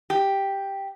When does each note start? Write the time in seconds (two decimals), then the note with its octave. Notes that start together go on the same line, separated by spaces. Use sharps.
0.10 G4